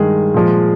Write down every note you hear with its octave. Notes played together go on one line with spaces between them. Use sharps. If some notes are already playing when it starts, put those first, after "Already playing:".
Already playing: G2 D#3 G#3 G#4
A#2 F3 G#3